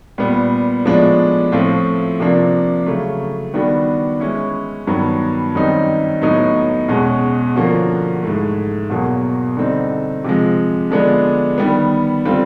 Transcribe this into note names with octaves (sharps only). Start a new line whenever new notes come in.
A#2 G3 B3
A2 F3 G#3 B3 D4
A2 F3 A3 C4 F4
C3 F3 A#3 D4
C#3 F#3 A3
D#3 G3 B3 D4 F#4
E3 G#3 C#4 E4
G2 D#3 F#3 B3
F#2 D#3 G3 C4 D#4
A2 F#3 B3 D#4
E2 B2 G#3 C#4
D3 F3 A#3 C#4 F#4
G#2 E3 A3
E2 B2 F#3 A#3
D3 G3 C4 D#4
C3 F3 G#3
D3 F3 G#3 B3 D4
D#3 G3 B3
D3 G3 C4 F4